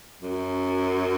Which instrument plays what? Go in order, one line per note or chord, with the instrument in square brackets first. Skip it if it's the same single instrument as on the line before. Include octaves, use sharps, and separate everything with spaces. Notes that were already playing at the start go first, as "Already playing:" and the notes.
[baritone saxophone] F#2